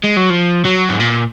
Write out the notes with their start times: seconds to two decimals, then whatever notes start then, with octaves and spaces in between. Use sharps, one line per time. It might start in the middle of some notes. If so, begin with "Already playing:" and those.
0.04 G#3
0.16 F#3
0.30 F3
0.65 F#3
0.89 G#2
1.00 A#2